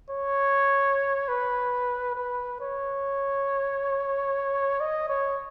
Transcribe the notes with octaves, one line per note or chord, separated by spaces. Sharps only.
C#5
B4
B4
C#5
D#5
C#5